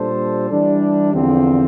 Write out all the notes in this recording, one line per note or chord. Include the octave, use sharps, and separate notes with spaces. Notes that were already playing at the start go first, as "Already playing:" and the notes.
Already playing: A#2 G3 D4 A4 C5
E3 G3 D4
E2 D3 F3 C4